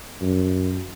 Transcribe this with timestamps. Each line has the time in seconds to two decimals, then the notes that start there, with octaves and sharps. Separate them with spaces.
0.22 F#2